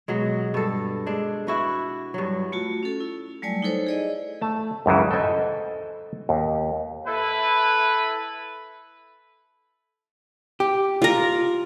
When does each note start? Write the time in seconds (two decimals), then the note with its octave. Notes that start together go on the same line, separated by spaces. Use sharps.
0.08 B2 F#3 G#3
0.54 G2 A4
1.06 G#3 D4
1.47 E4 F#4 B4
2.14 G2 F#3
2.52 A3 F4 F#4
2.83 C#4 A4
3.01 E4
3.42 F#3 G3 A3 D5 G#5
3.62 D#4 E4 A4 C5 C#5
3.87 G#4 D5 D#5
4.41 A3 A5
4.86 C#2 F#2 C#3 E3
5.11 A4 C5 D#5 G#5
6.29 D#2
7.07 E4 A4 B4
10.60 G4
11.02 F4 A#4